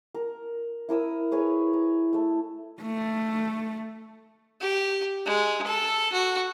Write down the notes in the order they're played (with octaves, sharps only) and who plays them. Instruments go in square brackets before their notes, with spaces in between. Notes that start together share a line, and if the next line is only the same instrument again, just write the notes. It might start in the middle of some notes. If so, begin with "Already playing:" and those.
[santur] A#4
E4 A#4 D#6 E6
G#4 B4 C#5 A#5
A#5
A3 E6
[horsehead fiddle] A3
[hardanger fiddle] G4
G#3
A4
F#4